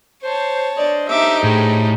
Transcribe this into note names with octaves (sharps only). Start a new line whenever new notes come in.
C5 C#5 A5
D4 C5 D5 D#5
D#4 G4 E5 D6
A2 G#4